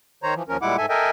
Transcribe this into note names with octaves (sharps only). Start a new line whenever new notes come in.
D#3 C5 C#5 A#5
E3 F3
D#2 F3 C#4 A#4
A#2 G3 G#3 E4 F#5 D6
G#2 A4 E5 G#5
A4 A#4 D#5 E5 G5 G#5